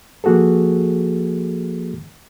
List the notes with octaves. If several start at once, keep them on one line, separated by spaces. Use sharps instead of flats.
F3 A#3 F#4 G#4 A4